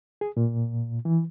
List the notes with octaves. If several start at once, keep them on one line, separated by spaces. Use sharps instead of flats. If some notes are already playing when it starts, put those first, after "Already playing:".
G#4
A#2
E3